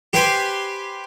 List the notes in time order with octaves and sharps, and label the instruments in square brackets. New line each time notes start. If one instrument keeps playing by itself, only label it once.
[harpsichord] G4 B4 C5 G5 G#5 C6